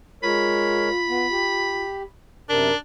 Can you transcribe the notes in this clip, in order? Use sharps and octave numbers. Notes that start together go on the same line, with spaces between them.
G#3 F4 A#4 C#5 B5
B3
G4
F#2 C3 D4 A#4